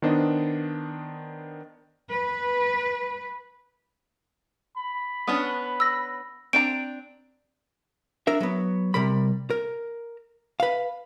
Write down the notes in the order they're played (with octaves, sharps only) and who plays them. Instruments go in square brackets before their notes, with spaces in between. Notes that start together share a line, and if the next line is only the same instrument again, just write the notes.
[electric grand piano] D#3 B3 D4 C5 D#5
[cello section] B4
[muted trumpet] B5
[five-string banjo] B3 C#4 D4 [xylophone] D#6
[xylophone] E6 A#6
[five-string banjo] C4 D4 A#5 [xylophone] D7
[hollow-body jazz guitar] D4 A#4 E5
F#3 B3
C3 G3 A#4 B5
A#4
B4 F5